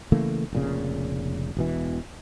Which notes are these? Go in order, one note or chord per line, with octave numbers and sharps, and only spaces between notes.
C#3 E3 A3 A#3
F1 A#2 C#3
E1 B2 E3